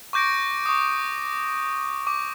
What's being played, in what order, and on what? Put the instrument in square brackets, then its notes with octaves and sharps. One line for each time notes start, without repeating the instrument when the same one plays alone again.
[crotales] C#6 D6 G6 A#6 D7
C#6 D#6
D6